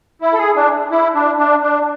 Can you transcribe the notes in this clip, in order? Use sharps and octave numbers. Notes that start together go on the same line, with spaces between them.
E4
A4
G#4
D4
E4
D4
D4
D4